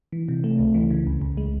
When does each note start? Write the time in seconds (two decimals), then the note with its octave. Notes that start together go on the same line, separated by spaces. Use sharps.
0.12 E3
0.29 C3
0.44 A3
0.59 C#2
0.74 E3
0.91 C#3
1.07 C#2
1.21 C#2
1.37 G#3